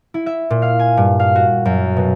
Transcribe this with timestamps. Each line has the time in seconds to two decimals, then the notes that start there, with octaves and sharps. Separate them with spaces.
0.14 E4
0.26 E5
0.50 A#2
0.62 F5
0.79 G#5
0.97 G2
1.20 F5
1.35 F#4
1.65 F#2
1.97 B2